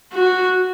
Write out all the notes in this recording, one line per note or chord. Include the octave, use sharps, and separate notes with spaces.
F#4